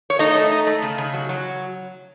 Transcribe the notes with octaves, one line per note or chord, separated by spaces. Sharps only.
C#5
A3 D#4 D#5
A3
D#4
A3
C#3
C#3
F#3
F#3